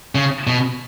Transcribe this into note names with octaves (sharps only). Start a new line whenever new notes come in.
C#3
B2